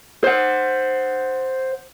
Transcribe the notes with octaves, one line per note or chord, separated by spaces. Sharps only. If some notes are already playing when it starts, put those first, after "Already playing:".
C5 F#5